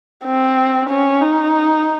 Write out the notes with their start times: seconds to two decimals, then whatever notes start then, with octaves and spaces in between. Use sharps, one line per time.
0.25 C4
0.90 C#4
1.22 D#4